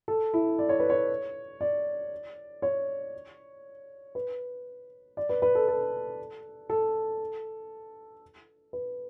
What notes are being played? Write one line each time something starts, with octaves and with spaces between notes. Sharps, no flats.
A4
E4
D5
C#5
B4
C#5
D5
C#5
B4
D5
B4
B4
A4
A4
A4
B4